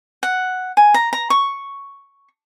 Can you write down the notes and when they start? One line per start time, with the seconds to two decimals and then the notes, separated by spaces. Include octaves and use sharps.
0.23 F#5
0.77 G#5
0.94 A#5
1.13 A#5
1.30 C#6